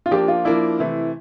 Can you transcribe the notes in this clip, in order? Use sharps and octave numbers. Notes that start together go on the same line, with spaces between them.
F4
F3 A#3 D4 G4
F4
F3 A#3 D4 E4
C3 E3 A3